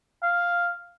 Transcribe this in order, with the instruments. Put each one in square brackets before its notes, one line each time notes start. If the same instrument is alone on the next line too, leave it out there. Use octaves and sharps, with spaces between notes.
[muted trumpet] F5